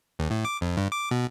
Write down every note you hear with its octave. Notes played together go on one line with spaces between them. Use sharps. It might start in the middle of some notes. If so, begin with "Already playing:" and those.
D#2
A2
D6
F2
G2
D6
B2